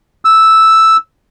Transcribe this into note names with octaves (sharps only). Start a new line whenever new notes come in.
E6